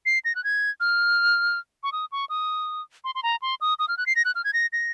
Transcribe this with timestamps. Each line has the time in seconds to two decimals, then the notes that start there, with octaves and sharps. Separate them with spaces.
0.06 C7
0.25 A#6
0.35 F#6
0.44 G#6
0.80 F6
1.83 C#6
1.92 D#6
2.12 C#6
2.29 D#6
3.04 C6
3.15 C6
3.23 A#5
3.42 C6
3.61 D#6
3.79 D#6
3.88 F6
3.98 F#6
4.06 C7
4.16 A#6
4.25 F#6
4.35 F6
4.44 G#6
4.53 A#6
4.73 A#6